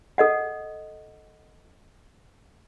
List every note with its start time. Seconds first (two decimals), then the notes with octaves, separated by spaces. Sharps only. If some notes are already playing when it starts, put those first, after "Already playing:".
0.18 A4 D#5 F#5